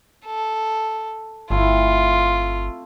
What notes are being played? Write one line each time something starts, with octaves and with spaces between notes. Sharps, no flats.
A4
G1 A3 C4 E4 F4